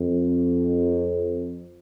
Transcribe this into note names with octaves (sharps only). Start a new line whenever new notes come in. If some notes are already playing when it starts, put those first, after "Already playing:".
Already playing: F2